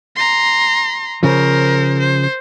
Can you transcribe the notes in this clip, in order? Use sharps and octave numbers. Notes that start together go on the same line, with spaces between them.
A#5 C6
C#3 F3 A#4 C5
C5